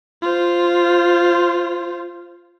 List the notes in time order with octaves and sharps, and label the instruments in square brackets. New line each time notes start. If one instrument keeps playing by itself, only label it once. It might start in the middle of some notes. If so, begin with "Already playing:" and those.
[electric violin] F4 C5